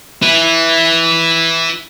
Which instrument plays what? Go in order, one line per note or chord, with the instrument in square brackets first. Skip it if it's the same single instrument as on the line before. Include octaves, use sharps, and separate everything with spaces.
[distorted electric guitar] E4 B4